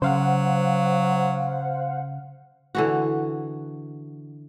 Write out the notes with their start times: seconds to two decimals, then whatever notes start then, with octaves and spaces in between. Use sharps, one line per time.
0.02 C#3 F#3 C5 F5 F#5
2.75 D3 E3 F#4